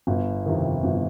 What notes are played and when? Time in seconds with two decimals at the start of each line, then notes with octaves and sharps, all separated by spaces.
0.07 G1
0.46 F2 C3 D#3
0.84 G1